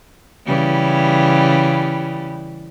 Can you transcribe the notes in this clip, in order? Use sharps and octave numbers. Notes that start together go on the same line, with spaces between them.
C#3 E3 G3